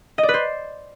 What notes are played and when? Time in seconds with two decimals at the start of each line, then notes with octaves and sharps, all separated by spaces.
0.18 D#5
0.23 D5
0.29 B4
0.34 C5